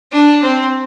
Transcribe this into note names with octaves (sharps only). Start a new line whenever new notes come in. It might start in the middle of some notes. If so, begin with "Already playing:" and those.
D4
C4